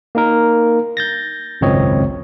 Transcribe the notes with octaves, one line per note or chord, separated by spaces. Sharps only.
A#3 D#4 A#4
G6 A6 A#6
G#1 C#2 F#2 C4 C#5 D#5